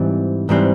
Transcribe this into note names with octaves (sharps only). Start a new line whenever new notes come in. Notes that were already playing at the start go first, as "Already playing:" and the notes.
Already playing: G#2 E3 G3 C4
G#2 E3 G3 C4